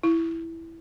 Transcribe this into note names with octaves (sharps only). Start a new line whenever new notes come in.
E4